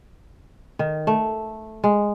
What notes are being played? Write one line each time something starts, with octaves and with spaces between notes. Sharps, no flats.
D#3
A3
G#3